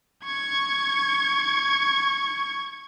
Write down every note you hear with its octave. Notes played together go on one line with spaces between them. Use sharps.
C#6 G#6